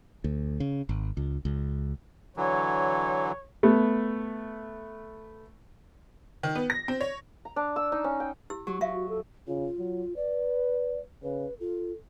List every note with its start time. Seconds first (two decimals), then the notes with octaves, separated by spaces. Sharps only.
0.24 D2
0.60 C#3
0.89 G#1
1.17 C#2
1.45 C#2
2.37 D3 E3 F#3 C#5
3.63 A3 B3
6.43 D#3
6.55 B3
6.70 A#6
6.88 C4
7.01 C#5
7.45 A#5
7.56 D4
7.76 E6
7.92 D#4
8.04 C#4
8.20 G5
8.50 E4 G4 E6
8.67 F#3 G4
8.81 F#3 F4 E5 F5
8.93 F#4
9.09 A4
9.47 C#3 F4
9.78 F#3
10.16 B4 D5
11.23 C#3 B4
11.60 F4 A4